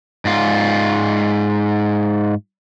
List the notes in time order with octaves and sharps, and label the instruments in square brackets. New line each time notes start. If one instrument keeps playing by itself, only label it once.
[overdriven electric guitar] G#2 F4